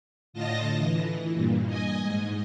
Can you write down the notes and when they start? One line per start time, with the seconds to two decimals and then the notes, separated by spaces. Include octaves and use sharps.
0.33 A2 D3 F4 D#5 A5 A#6
0.76 E3
1.33 G2 A#2
1.67 D#5 G#5
2.01 G#2